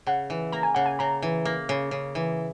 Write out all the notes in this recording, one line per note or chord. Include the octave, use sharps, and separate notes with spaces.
C#3 F#5
E3
A#3 A#5
G#5
C#3 F#5
G#5
C#3 A#5
E3
A#3
C#3
C#3
E3